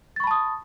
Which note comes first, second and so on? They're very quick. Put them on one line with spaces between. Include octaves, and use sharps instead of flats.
A6 C#6 B5 A5 D#6